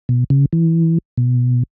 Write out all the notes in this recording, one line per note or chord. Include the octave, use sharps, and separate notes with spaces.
B2
C#3
E3
B2